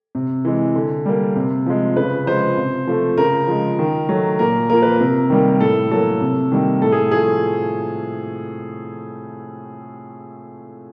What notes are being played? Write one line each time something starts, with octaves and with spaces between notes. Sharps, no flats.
C3
E3 G#3
D3
G3 A#3
C3
F3 G#3
C#3 B4
F3 G#3 C5
C3
F3 A3
C#3 A#4
F3 G#3
D#3
F#3 A3
A#2 A#4
F3 A#3 A#4
B4
C3 A#4
D#3 G3 A#3
A2 A4
F#3 A#3 A4
C3
D#3 G3 A#3
A2 A4
G#4
F3 A3 G#4